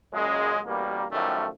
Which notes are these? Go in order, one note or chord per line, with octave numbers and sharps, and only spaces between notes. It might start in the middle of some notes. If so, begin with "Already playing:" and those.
F#2 A#2 C#3 G#3
A1 B2 G3 A#3
F#2 A2 D#3 F3 G3 A3